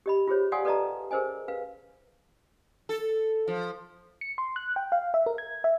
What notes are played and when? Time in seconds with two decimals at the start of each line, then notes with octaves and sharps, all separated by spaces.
0.06 G4 D#5 B5
0.27 F4 G4 G#4 C5 C#5
0.52 D5 F5 F#5 G#5 C6 D#6
0.65 A4 B4 D5 D#5 A5 A#5
1.11 G#4 A#4 C5 D#5 G#5
1.48 B4 F5
2.89 A4
3.48 F3
4.21 C#7
4.38 C6
4.56 F#6
4.76 G5
4.92 F5
5.14 E5
5.26 A#4
5.38 G#6
5.64 E5